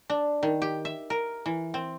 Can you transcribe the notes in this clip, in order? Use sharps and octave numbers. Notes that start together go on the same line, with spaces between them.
D4
D#3
G4
E5
A#4
E3
C4